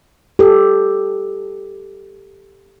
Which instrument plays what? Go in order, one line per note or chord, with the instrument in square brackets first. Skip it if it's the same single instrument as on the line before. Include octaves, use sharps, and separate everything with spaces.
[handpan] G4 A4